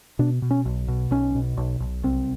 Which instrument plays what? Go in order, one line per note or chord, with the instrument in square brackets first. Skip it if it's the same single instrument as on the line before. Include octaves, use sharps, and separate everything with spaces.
[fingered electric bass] B2 D4
B2
C#4
B1
B2
B1 C#4
B2
B1
B1
C2 C4